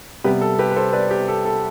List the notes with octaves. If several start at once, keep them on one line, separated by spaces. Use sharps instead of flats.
C3 G3 B3 G4 B4
A4
G4 B4
B4
A4 C5
B4 D5
G4
A4
A4